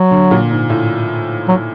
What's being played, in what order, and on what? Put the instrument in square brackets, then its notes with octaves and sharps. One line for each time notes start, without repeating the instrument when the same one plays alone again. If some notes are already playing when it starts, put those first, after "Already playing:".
Already playing: [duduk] F#3
[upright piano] D3
A#2
G#2
A2
[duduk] F#3